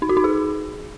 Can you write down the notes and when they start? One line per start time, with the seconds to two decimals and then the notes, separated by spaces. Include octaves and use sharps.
0.02 D#4
0.09 F#4
0.17 D#4
0.24 G#4